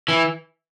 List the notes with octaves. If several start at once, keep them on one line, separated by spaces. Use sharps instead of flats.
E3